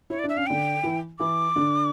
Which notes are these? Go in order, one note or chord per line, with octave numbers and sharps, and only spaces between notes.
E4 C#5
D5
D4 E5
C#4 F5
D3 D4 G5
E3 E4
E3 E4 D6
D3 D4